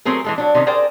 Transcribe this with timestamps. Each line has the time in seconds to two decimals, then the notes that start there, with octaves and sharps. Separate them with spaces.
0.05 F#3 A3 C4 G#4 A#4
0.24 E3 G#3 A4
0.38 F#3 D4
0.55 C3 D#3 C#4
0.67 G#4 A#4 C5 D5 G5